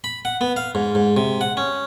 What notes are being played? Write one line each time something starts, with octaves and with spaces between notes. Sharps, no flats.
B5
F#5
B3
F5
G#2
G#2
C3
F#5
C#4